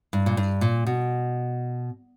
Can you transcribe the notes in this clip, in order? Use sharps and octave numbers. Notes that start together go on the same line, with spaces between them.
G2
A#2
G2
A#2
B2